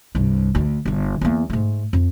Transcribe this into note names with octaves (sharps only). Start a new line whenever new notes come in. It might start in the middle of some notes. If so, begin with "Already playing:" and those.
C2 G2
D2
G1 D3
E2 A#3
G#2 A3
F2